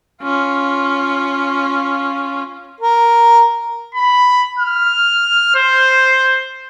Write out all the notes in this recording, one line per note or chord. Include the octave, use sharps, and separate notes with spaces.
C#4 F4
A#4
B5
F6
C5